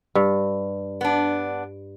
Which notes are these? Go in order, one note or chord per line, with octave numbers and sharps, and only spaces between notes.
G2
B3 D4